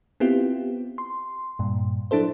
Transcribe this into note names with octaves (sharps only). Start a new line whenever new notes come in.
B3 C4 E4 F4 G4
C6
G2 A#2
F#3 D4 E4 A4 C5